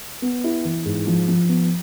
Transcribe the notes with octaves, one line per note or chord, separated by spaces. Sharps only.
B3
E4
E3
G#2
F3
F3
B3